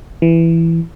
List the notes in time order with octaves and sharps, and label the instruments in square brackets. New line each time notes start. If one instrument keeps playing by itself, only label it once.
[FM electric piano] E3